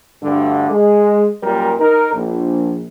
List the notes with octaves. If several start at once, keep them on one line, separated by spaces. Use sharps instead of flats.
D2 G2 D3
G#3
F#2 A#2 G3 A#4
D#4 A#4
A#1